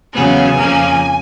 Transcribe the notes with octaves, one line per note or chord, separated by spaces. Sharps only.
E2 C#3 F#3 B3 G#5
F2 C#3 F3 A#3